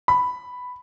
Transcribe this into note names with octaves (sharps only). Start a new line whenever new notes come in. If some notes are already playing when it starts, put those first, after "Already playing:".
B5